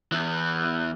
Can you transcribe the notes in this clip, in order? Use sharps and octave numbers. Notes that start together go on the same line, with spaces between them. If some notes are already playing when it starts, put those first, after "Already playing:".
E2 E3